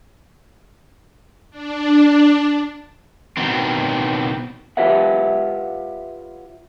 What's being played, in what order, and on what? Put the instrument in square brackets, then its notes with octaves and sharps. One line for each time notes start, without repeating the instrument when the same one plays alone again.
[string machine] D4
[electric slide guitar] B2 D#3 F#3 C4
F4 G4 B4 C#5 E5 F#5